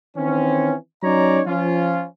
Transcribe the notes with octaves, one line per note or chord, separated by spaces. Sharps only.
D#3 E3 C4 C#4
F#3 C#4 D#4 C#5 D5 A#5
F3 C#4 F4